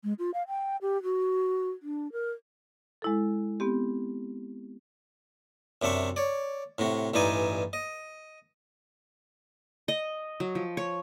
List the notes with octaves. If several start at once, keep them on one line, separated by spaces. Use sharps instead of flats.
G#3
F4
F5
G5
G4
F#4
D4
A#4
G#3 E4 A4
B3 C4 G4
F#2 C3 D4 E5 C#6
C#5 D5
A2 C3 F#4
A1 G2 E3 D#4 D5 G#5
D#5
D#5
F#3
F3
C#5